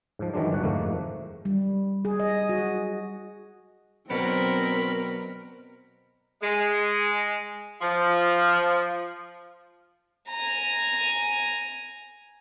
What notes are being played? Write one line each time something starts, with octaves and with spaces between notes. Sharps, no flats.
G#2 F3
D#3 E3 F#3 G#3 D4
G1 F#4 F#5
F2 G#2 D#3 A3 A#3
G3
G#4
D#5
F#4
B2 F#3 C4 D4 A#4 B5
G#3
F3
G#5 A#5